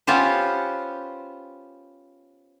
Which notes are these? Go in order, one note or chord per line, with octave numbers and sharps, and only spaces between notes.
B3 C#4 F4 G4 C5